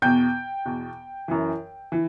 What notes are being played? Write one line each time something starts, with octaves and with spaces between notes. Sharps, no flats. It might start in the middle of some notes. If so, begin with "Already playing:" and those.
E2 B2 G5 G6
E2 B2
F#2 E3
E3